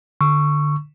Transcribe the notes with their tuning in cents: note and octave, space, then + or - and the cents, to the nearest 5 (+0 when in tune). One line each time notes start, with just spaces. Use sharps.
D3 +15 C#6 +0 E6 +25